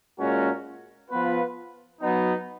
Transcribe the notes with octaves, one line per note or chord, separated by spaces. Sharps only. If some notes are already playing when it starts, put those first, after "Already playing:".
A#2 G#3 C#4 F#4 A#4
F3 B3 F4 B4
F#3 B3 D#4